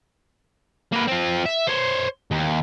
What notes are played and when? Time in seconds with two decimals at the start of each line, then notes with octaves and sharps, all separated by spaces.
0.92 A#3 B4
1.07 C4 F4
1.45 E5
1.67 C5 C#5
2.31 D#2